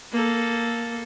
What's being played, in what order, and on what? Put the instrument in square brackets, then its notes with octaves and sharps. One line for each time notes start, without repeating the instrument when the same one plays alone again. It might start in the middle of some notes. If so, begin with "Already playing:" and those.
[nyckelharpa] A#3 A4